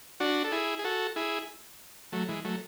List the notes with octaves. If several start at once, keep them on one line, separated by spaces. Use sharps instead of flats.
D4 F#4
A4
E4 G#4
G#4
F#4 A4
E4 G#4
F#3 A3
E3 G#3
F#3 A3